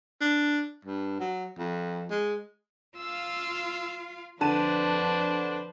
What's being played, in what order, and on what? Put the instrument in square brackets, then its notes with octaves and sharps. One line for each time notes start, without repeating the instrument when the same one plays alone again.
[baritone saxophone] D4
G2
F#3
F2
G#3
[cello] F4 F5 [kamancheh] E6
[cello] F2 [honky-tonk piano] D3 A5 D#7 [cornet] D4 [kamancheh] B4 C5